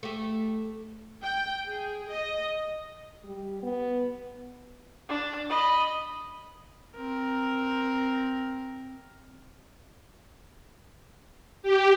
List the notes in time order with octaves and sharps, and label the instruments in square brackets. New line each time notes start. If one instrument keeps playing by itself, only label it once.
[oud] A3 G4
[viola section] G5
G#4
D#5
[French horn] G3
B3
[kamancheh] D4
D#5 B5
[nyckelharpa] C4 A#4
[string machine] G4